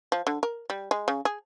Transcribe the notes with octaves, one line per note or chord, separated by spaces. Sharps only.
F3
D3
A#4
G3
G#3
C#3
G#4